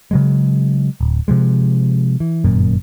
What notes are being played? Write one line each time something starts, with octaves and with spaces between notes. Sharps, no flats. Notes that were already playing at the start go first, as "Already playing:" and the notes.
C#3 F#3 G#3
D1
C3 F3 G#3
E3
G1 F#2 A#2